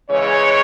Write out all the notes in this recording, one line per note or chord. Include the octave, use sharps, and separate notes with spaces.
C#3 E3 G#3 C#5